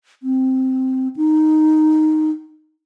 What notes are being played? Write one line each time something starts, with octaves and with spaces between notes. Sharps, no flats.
C4
D#4